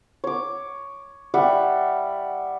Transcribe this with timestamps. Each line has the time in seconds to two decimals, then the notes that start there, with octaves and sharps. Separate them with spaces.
0.24 C#5 D6
1.34 G3 E5 F#5